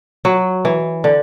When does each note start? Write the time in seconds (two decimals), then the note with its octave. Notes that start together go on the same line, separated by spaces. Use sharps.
0.25 F#3
0.65 E3
1.04 D3